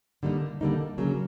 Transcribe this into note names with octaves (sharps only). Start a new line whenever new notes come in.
D3 G3 A#3 D#4
D3 G3 A#3 D#4
C#3 F#3 A#3